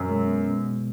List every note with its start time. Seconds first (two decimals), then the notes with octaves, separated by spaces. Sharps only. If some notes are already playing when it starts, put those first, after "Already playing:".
Already playing: F#2 B2
0.09 G#3
0.28 B3
0.47 B2
0.66 B2